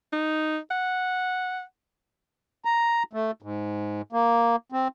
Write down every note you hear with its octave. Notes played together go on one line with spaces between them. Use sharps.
D#4
F#5
A#5
A3
G#2
A#3
C4